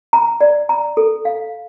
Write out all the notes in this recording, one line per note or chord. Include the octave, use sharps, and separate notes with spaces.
A#5
D5
A#5
A4
F5